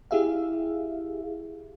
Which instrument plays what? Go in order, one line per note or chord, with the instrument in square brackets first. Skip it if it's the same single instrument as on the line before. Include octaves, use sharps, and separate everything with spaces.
[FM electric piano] E4 G4 G#4 E5 F5